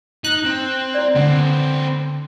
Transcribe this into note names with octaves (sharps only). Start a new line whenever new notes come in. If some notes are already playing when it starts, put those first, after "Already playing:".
D#4 F#6
C4
E4 D5
D3 C4 B4